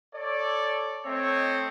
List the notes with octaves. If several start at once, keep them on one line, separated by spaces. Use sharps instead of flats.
A4 C#5 D5
A3 C4 C#5 D#5